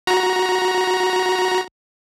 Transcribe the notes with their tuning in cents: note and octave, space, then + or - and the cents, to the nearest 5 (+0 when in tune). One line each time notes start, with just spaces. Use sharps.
F#4 -5 A#5 +15